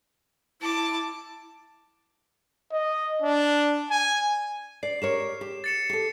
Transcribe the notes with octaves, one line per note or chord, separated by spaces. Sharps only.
E4 A5 D6
D#5
D4
G#5
D5 C7
G4 A#4 C#5 E7
G4
A6 C#7 E7
G4 A4